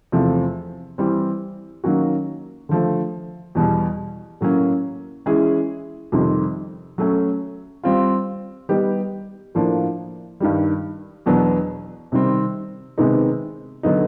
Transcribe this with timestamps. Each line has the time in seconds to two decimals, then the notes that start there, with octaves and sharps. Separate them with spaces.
0.12 E2 C3 F3 A3
0.98 E3 G3 C4
1.84 D#3 F#3 A#3 C#4 F#4
2.69 D3 F3 A3
3.55 E2 B2 G3
4.41 A2 F#3 A#3 C#4
5.26 E3 G#3 C#4 E4 G#4
6.12 F2 C3 D#3 G3 C4
6.98 F#3 A3 C#4
7.84 G3 C4 F4
8.69 G3 B3 D#4 G4
9.55 A2 F3 A#3 D4
10.40 G2 D#3 G3
11.26 E2 B2 F#3 B3 D4
12.12 C3 D#3 G3 C4
12.98 C3 D#3 G#3 B3 D#4
13.83 D3 F#3 B3 D#4